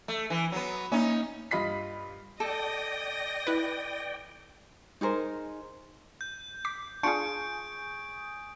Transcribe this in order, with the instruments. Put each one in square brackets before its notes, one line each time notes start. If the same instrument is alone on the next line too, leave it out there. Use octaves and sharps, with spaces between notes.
[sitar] A3
E3
F#3 B3
[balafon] A#3 [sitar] C#4 D#4
[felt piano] G2 F4 D#5 B5 B6 C7
[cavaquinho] A4 [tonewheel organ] D5 G5 [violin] D#5 A#6
[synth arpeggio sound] E4 B4
[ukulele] D#4 G#4 A#4 C5
[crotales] G6
[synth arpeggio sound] D6 B6 C7
[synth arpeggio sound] D4 F4 F5 [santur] G#4 C#6 [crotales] G6 D7